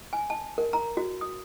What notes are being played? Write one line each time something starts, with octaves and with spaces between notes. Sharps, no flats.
G#5
A5
A#4
A#5
F#4
D#6